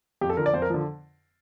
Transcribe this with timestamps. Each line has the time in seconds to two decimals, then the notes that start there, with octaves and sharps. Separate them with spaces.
0.21 F2 G4
0.30 A4
0.37 D3 F3 A#4
0.46 D5
0.54 F2 C5
0.62 A#4
0.70 D3 F3